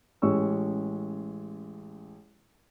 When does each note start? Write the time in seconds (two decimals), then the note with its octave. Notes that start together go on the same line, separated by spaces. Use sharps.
0.22 A1 G#3 C#4 C#6 E6